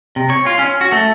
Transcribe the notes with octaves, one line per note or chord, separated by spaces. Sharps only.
C3
C#5
F4
C#4
F#4
A3